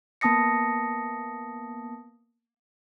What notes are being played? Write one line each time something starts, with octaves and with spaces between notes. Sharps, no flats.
A#3 B3 A5 D#6 A#6 C#7